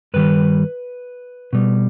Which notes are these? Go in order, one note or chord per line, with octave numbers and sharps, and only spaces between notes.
G2 D#3 G3 B4
B2 G3